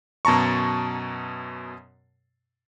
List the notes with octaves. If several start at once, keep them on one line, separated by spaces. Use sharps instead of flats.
F#2 B2 A5 A#5 C#6